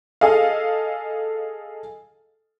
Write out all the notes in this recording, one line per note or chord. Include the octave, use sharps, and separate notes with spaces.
G#4 A4 D#5 F5